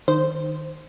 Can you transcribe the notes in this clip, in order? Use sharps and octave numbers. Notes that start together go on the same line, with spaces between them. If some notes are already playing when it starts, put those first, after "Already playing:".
D#3 C5